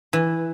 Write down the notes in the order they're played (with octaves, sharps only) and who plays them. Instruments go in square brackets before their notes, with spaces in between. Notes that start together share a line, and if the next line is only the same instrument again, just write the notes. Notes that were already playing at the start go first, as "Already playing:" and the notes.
[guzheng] E3